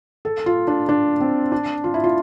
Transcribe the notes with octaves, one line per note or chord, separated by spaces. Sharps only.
A4
F4
D4
D4
C4
D4
F4
E4
F4